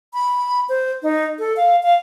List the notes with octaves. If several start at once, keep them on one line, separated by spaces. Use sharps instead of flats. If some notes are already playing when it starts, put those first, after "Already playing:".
B5
C5
D#4
A4
F5
F5